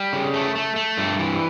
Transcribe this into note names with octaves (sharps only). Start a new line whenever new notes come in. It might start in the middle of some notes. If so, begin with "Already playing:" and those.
Already playing: G3
C#3
A3
A3
A3
G2
E3